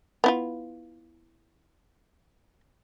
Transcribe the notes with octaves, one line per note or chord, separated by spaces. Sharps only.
B3 E4 F4